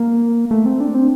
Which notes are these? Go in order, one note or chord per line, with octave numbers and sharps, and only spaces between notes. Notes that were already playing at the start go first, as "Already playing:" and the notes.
Already playing: A#3
A3
C4
D4
C4